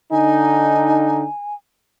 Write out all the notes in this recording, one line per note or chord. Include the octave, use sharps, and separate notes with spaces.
D3 D#4 G#5